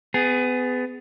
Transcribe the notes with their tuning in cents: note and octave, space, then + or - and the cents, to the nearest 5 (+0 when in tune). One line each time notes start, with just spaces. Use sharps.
B3 +30 G#4 +0